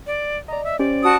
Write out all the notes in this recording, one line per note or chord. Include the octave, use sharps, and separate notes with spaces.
D5
D5 D#5 A#5
E5
C#4 G4 C5 D5
F#4 A5 D#6